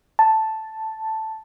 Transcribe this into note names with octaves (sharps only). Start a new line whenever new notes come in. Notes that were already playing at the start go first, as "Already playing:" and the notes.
A5